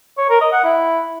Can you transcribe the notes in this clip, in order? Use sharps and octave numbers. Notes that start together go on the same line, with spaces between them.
C#5
A#4
D#5
F#5
E4